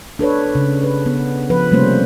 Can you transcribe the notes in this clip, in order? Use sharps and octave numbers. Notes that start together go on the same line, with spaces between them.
D4 A4 B4 C#5
C#3
B4
B3
F3 B4
C3 G3 A3 A#3 C#4 C5